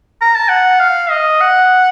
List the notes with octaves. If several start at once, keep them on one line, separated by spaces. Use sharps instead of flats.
A#5
A5
F#5
F5
D#5
F#5